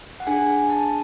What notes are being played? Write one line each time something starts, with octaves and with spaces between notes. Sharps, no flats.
F#5
D4 G#4 G#5
G#5
A5